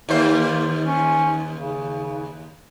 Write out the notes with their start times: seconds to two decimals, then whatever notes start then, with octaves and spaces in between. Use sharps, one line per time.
0.09 D#2 A#3 C5
0.87 C#4
1.57 C#3